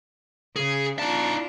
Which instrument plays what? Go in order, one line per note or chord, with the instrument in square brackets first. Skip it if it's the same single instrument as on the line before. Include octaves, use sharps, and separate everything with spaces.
[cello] C#3 [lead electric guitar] G#4
[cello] D4 F4 [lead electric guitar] D#4 A5